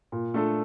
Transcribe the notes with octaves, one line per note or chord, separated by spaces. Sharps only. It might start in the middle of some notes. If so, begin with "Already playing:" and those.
A#2
A3 D4 F4 A4